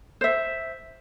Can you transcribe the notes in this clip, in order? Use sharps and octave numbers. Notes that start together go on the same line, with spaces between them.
C5 E5